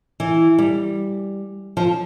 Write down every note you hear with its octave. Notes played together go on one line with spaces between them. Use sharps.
E3
G3
F3